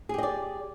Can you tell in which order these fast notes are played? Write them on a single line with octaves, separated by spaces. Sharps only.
G#4 G4 D#5 D5